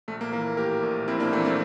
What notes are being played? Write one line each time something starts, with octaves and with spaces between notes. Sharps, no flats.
A#1 A3
A#3
E3 A#3
A2 G4 A#4
A#1
A#1 C4 E4
A#3 D4
E3 A3 C4
A3 C4